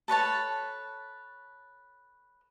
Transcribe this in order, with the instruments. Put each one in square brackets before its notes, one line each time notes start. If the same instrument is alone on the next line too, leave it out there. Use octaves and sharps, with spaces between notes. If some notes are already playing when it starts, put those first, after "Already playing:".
[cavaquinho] A4 B4 C#5 A5